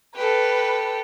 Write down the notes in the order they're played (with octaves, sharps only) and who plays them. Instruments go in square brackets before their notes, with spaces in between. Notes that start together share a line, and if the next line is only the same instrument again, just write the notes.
[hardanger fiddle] G4 A4 [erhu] B4